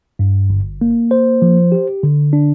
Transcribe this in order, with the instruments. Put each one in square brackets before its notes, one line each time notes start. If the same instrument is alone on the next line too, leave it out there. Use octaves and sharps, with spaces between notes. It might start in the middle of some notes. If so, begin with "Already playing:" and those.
[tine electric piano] G2
G1
A#3
C5
F3
G4
D3
D4